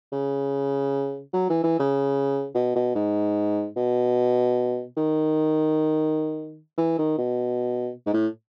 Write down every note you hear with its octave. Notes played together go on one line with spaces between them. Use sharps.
C#3
F#3
E3
E3
C#3
B2
B2
G#2
B2
D#3
E3
D#3
B2
G#2
A2